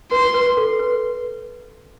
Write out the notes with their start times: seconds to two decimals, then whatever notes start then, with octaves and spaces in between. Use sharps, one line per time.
0.11 B4 C6
0.34 B4
0.57 A4
0.79 B4